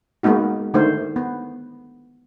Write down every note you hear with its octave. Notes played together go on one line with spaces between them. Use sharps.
G#3 A#3 B3 D#4 F#4
D3 D#3 A3 C5
B3